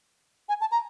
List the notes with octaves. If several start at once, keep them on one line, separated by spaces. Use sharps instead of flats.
G#5
A5
A#5